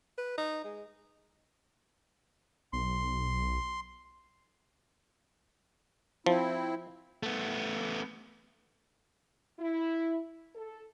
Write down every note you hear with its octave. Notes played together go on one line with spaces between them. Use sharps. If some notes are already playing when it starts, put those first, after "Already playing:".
B4
D#4
G#3
B1 C6
F3 C4 E4
A3 B3
E4
A4